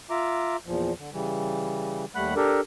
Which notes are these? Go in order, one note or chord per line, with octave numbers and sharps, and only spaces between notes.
F4 E5 A#5 D6
E2 A#2 F3
D3
C#3 E3 G3
D#2 G3 A3 F#5 B5 F#6
D4 G4 A4 A#4